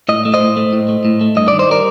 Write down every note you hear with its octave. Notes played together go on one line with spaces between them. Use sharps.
A2 D#5
A3
C5 D#5
A2
A3
A2
A3
A2
A3
G2 D#5
D#3 D5
C5
G3 A#4 D5